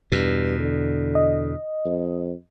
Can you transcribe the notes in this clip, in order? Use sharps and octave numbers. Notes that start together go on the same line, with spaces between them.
E2 G2 B2
D3
D#5
F2